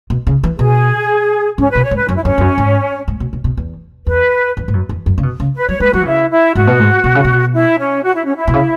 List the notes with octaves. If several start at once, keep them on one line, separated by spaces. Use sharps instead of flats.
B2
C#3
E3
B2 G#4
G#2 C#4
B2 B4
C#5
G#2
B4
F#2 C#4
E4
F#2 C#4
E2
F#2
G#2
G#2
B2
B2
B2
E2
E2 B4
E2
G#2
F#2
E2
F#2
C#3
B2
C#3
B4
F#3 C#5
G#3 B4
F#3 F#4
E3
C#3 E4
E4
G#2 F#4
B2
G#2
B2
C#3
B2
E4
C#4
F#4
E4
C#4
E4
B2
C#3